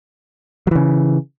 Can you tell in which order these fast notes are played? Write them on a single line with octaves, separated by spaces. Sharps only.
F#3 E3 C#3